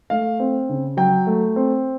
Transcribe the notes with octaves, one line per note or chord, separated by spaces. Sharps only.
A3 F5
C4
C#3
F#3 G5
A3
C4